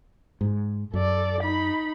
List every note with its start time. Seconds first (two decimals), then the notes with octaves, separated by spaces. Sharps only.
0.41 G#2
0.94 F#2 A4 D5
1.42 D#4 B5